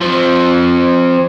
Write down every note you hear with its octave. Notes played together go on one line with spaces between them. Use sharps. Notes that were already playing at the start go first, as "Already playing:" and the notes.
F3 C4